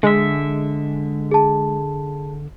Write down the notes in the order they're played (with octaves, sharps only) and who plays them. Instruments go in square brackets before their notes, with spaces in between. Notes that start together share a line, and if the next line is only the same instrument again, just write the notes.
[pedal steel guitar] D3 E5 [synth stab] G#3
[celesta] G#4 A5